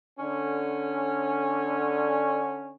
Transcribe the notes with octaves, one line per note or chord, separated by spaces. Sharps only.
D3 C#4